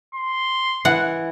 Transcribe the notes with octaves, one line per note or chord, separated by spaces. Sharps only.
C6
E3 F#5